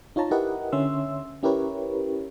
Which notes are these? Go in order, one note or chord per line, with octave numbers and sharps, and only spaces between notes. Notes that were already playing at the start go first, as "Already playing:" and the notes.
D#4 F4 C#5 A5 A#5
E4 G4 A#4 B4 D#5 F#5
D3 C#4 E5 C6 E6
C#4 E4 G4 A#4 B4 C#5